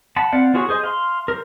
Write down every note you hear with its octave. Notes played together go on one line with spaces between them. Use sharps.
F#5 A5 B5
C4 D5 F5 F#5
B3 F4 F#4 G#4 C#5
G#4 C5 D#5
F5 C6
A#4 C5